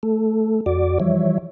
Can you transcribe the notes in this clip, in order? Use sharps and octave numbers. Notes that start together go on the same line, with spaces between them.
A3 A4
F2 F#4 D5 D6
E3 F3 G3 C#5 E5